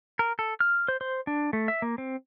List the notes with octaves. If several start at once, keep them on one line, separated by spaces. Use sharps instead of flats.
A#4
A4
F6
C5
C5
D4
A3
E5
A#3
C4